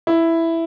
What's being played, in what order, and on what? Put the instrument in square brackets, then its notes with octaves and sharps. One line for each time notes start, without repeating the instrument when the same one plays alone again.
[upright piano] E4